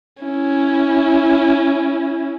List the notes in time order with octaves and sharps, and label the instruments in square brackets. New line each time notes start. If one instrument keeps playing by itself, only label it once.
[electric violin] C#4 E4